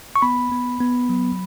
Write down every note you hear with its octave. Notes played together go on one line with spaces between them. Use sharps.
C#6
B3 B5
B3
B3
F#3